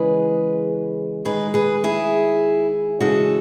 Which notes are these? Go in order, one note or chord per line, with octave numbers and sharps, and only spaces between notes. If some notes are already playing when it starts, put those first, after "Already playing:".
Already playing: C#3 E3 G#3 G#4 B4
D#3 G#3 G#4 B4
G#4 B4
E4 G#4
C#3 E3 G#3 F#4 A4